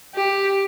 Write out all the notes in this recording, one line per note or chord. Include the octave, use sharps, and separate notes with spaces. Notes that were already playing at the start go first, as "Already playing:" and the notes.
G4